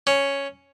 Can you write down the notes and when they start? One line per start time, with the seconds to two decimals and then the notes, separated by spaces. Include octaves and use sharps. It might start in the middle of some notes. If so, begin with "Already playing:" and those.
0.07 C#4